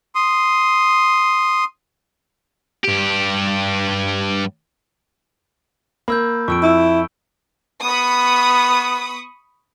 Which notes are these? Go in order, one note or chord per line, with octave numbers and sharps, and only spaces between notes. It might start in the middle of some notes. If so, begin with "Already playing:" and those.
C6 D#6
G2 G4
A#3 B5 E6 G6
F2 C#6 E6 D7
E4
B3 B5 C#6 D#6